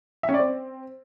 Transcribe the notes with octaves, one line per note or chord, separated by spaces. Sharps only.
E5
C#4
D5
C4